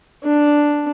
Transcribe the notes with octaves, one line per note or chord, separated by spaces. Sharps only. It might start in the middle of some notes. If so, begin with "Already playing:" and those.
D4